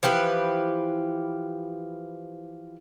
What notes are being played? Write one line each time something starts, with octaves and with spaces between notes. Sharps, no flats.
E3 F3 G4 B4